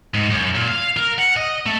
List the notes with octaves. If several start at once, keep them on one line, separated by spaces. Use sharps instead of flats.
G#2
F#2
A#2
F5
A#4
F#5
D#5
A3